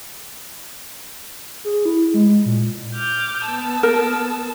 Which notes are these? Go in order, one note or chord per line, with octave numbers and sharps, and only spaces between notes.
G#4
E4
G#3
A#2
D6 F6 G6
B3 A5 E6
A#4